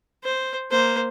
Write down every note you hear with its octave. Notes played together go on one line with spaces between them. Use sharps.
C5
A#3 C5